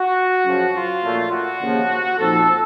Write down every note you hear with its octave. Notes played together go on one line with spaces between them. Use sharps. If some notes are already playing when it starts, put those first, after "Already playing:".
Already playing: F#4
F#2 C#3 F3
F4
A#1 A#2 A3 C#4
F#4
D#2 C#3 F3
A#2 F3 C4 D#4 A4